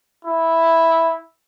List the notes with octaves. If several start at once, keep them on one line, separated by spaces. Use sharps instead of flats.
E4